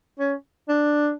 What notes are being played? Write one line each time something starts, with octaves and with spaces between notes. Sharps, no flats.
C#4
D4